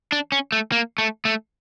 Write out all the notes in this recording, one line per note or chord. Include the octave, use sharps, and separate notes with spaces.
D4
C#4
A3
A#3
A3
A3